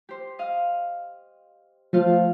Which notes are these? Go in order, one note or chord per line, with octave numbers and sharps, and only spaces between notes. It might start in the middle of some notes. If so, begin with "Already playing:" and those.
G4 C5
D#5 F5
F3 A3 F4 F5